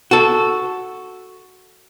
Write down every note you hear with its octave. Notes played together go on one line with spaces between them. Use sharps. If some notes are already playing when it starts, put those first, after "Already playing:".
F#4 A4